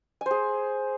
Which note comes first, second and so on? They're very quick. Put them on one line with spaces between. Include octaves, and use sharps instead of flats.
G#5 C5 G#4